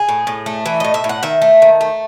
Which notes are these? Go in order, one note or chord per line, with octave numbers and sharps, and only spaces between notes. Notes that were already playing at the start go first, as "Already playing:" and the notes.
Already playing: G#4
A2
A2
A3
E3 E5
A2 D#5
E5
A2
F#5
D#3 E5
A3
D#3
A3